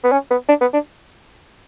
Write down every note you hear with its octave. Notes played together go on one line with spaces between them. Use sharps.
B3
C#4
B3
D4
B3
D4